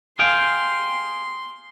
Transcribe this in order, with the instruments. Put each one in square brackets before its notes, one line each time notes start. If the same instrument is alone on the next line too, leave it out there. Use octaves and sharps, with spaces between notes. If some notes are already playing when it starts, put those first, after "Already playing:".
[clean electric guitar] G#4 F5 G5 [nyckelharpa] C6